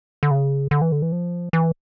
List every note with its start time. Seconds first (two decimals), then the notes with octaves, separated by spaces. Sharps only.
0.23 D3
0.31 C#3
0.71 D3
0.82 E3
0.92 D3
1.02 E3
1.12 F3
1.53 E3